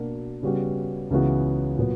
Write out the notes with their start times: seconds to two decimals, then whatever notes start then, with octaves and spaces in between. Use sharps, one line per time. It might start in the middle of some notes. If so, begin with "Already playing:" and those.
Already playing: B2 A#3 D4 F#4
0.43 C#3 G3 B3 F#4
1.11 C#2 C#3 E3 B3 F#4
1.78 A#2 F#3 B3